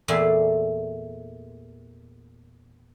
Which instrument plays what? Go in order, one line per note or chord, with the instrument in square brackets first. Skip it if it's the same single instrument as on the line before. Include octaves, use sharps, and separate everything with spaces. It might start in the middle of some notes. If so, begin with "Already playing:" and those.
[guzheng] E2 A#2 A3 D5 G#5 C6